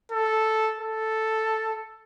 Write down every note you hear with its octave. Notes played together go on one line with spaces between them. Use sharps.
A4
A4